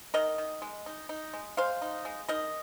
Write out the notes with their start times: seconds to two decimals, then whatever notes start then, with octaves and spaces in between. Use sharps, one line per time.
0.14 D#3 A#4 D#5
0.38 D#3
0.62 G#3
0.86 D#4
1.09 D#4
1.34 G#3
1.57 G#3 C5 F5
1.82 D#4
2.05 G#3
2.28 D#4 A#4 D#5